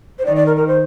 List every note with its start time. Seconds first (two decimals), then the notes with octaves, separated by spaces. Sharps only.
0.19 C5
0.25 D#3 D5
0.36 D5
0.46 A#4
0.57 A#4
0.67 C5